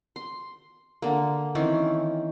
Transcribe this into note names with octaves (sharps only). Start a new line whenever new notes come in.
C6
D3 A#3
D#3 E3 C4 C#4